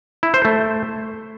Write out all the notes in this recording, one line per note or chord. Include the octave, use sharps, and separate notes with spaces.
E4
C5
A3